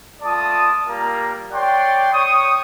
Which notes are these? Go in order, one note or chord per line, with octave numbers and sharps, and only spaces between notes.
A3 F4 D5 A5 D#6
G3 A#3 F4 A#4 A#5
C#5 D5 F#5 G5 C6
C#5 G5 C#6 D#6